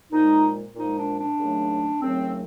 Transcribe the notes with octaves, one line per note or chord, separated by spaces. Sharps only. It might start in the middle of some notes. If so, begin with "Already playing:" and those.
A#2 F3 G#3 D#4
A#2 F3 G#3 D#4
D4
D4
D#2 C#3 F#3 A3
D#2 C#3 F#3 A3 C4